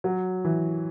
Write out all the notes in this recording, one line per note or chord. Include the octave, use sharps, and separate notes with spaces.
F#3
E3